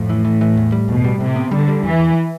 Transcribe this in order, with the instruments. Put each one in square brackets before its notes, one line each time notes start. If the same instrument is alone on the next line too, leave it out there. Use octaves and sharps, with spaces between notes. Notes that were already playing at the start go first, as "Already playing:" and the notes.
Already playing: [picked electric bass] F2 [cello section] A2
[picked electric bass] E3
E3
E3
E2
G3
[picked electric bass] E2 [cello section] B2
[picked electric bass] G3
[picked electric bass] A2 [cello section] C3
[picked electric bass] B3
[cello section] D3 [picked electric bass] G3
[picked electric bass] G3
[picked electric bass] E2 [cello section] E3
[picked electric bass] E2